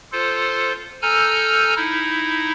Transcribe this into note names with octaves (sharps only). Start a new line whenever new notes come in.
F4 A4 C5
A4 G#5 A#5 E6 F6 G6
D#4 E4